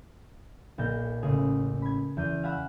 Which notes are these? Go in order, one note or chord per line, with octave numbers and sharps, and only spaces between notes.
B1 A#2 G6
A1 C#3 G#4 D#6
B5 G#6
E2 G6 D#7
F5 F#5 G#5 B5 E6